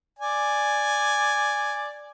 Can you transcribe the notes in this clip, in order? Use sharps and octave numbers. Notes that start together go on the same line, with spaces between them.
D5 G#5